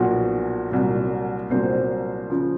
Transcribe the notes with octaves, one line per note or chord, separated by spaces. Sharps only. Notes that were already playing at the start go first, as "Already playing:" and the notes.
Already playing: B1 A#2 F3 F#4
C2 A#2 F#3
C2 A#2 F#3 C5
C#3 F3